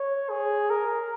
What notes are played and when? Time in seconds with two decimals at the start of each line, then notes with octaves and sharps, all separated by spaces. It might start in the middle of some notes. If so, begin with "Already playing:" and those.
Already playing: C#5
0.29 G#4
0.70 A#4